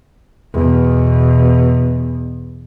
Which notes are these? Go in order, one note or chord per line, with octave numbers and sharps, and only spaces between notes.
E2 B2